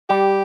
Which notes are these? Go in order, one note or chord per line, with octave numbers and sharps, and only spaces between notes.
G3 G4